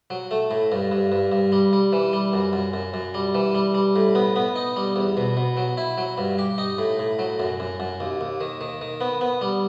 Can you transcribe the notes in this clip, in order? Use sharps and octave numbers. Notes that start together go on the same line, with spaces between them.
F#3
A3
A2
G2
G2
G2
G2
G3
G3
E3
G3
F#2
F#2
F#2
F#2
G3
E3
G3
G3
A2
B3
B3
D#4
G3
E2
B2
B2
F#3
E4
F#3
G2
G4
D#4
A2
A2
F#3
F#2
F#2
F#2
D#2
D#2
D#3
D#3
D#3
B3
B3
G3